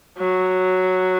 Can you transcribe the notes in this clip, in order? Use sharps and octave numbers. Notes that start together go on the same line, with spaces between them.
F#3